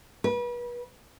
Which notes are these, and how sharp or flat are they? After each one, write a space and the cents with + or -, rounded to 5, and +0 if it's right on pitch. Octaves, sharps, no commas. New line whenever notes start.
B4 -35